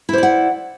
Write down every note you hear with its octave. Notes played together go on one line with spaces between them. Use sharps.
E4 C5 D5 F#5